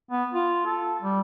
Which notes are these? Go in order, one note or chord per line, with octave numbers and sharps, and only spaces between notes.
B3
F4
A4
G3